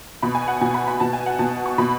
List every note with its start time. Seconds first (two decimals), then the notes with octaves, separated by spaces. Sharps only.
0.23 B2 B5
0.35 G#5
0.48 F#5
0.61 B2 G#5
0.74 B5
0.88 B5
1.00 B2 A5
1.13 G#5
1.26 F#5
1.39 B2 A5
1.66 C#6
1.78 B2 B5